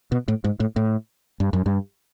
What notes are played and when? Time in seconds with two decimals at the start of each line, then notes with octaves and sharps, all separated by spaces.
0.12 B2
0.28 A2
0.44 G#2
0.60 A2
0.76 A2
1.40 G2
1.53 F#2
1.66 G2